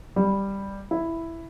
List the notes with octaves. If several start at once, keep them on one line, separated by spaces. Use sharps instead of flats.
G3
E4